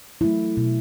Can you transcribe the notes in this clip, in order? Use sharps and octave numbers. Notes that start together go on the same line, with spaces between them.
F#3 A3 E4
B2